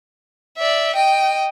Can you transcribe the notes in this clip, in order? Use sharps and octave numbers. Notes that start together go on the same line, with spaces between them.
D5 E5
D#5 G5